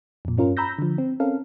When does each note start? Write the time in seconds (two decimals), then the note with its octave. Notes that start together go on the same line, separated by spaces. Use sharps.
0.25 F2 A#2
0.38 G2 C#4 F4 A#4
0.57 A#5 B5 E6 G6 A#6
0.79 D3 F3
0.98 C4
1.20 C4 C#4 A4 A#4 F5